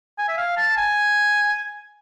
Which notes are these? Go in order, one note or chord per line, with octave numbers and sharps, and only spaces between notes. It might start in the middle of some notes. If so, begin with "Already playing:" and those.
G#5
E5
F5
A5
G#5